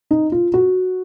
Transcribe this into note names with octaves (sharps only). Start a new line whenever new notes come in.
D#4
F4
F#4